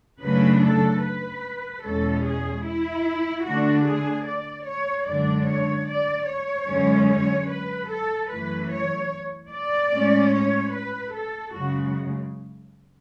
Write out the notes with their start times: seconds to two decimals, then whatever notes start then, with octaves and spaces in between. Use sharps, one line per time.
0.23 F#2 C#3 F#3 A3 D4 B4
0.63 A4
1.04 B4
1.84 E2 B2 G#3 C#4 A4
2.25 G#4
2.66 E4
3.46 D3 A3 D4 F#4
3.87 G#4
4.27 D5
4.67 C#5
5.08 F#2 D3 G#3 D4 D5
5.48 C#5
5.89 D5
6.29 C#5
6.69 F#2 D3 G#3 C#4
7.10 C#5
7.50 B4
7.91 A4
8.31 F#2 E3 A3 B4
8.71 C#5
9.52 D5
9.93 A2 G#3 C#4
10.32 C#5
10.74 B4
11.13 A4
11.54 F#2 C#3 G#3 F#4